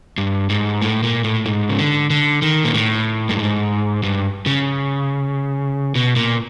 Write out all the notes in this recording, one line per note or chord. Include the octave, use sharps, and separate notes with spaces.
G2
G#2
A2
A#2
A2
G#2
C#3
D3
D3
D#3
A#2
A2
G2
G#2
G2
C#3
B2
A#2